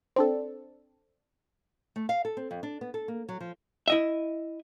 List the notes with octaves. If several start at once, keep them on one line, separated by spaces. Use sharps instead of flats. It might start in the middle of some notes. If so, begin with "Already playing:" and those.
C4 D4 A4
A3
F5
A4
C4
F2
D4
B3
A4
A#3
F#3
F3
E4 D#5 E5